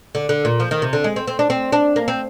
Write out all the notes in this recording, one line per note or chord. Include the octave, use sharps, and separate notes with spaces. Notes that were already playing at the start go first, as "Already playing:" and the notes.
D3
D3
A#2
F3
D#3
C3
D3
G#3
C4
C4
D4
C4
D4
A#3
C4